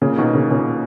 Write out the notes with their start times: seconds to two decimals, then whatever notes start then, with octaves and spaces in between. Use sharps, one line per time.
0.02 A#2 C#3
0.18 B2 D#3
0.34 A#2 C#3
0.51 A#2 C#3